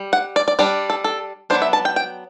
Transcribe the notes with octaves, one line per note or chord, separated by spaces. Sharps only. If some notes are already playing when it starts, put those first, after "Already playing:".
Already playing: G3
F#5
D5
D5
G3 D4 D5
A4
A4
F#3 B3 D4 C5
E5
A5
G5
G5